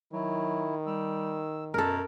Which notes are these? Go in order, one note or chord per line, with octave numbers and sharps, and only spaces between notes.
D#3 F#3 E4
G3 E6
F#2 B2 A4 A#4 A#5